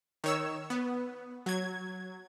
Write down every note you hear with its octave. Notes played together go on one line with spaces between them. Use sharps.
D#3 C#5 E6
B3
F#3 G#6